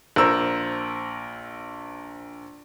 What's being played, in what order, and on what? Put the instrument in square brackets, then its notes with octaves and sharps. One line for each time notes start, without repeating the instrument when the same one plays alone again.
[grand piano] A#1 A#4 C5 E6